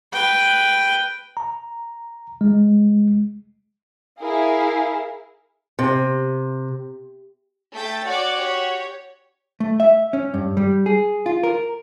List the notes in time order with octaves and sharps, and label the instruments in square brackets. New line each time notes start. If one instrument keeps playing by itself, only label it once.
[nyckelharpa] B4 G5
[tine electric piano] A#5
G#3
[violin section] E4 G#4 A#4 F5
[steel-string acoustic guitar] C3
[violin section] A3 G5 A6
[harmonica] F#4 [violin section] C#5 D5 D6
[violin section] G4 C#5
[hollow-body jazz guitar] A3
E5
C#4
G2
G3
G#4
F4
A#4